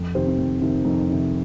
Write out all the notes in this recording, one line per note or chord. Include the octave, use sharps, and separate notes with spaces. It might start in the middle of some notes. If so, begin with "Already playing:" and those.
Already playing: F2
C3 D#3 G4 C5
C4
F2
C3 D#3
F2 D#4
C3 D#3